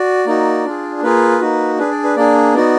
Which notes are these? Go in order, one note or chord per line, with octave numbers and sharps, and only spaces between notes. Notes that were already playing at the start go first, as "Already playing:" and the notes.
Already playing: F#4 D5
A#3 D#4 F#4
D4 F4 G#4
A#3 F4 G#4 B4
A#3 D#4 F#4
D4 G#4 B4
D5
B4
A#3 D4 G#4 D5
B3 D#4 F#4 D5